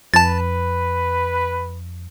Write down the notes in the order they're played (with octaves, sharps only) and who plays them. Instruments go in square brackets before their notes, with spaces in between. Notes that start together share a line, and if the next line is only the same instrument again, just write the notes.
[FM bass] F2 [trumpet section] B4 [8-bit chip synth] A5 A6